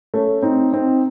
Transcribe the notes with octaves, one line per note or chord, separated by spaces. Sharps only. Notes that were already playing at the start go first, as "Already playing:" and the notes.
A3 C#4
C4 D#4
C4 D#4